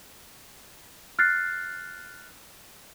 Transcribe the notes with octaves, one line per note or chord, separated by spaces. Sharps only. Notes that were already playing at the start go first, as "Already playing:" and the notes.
F6 F#6 A6 C7